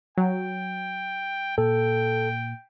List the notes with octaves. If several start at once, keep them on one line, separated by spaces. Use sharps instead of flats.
F#3 G5
A#2 A4 G5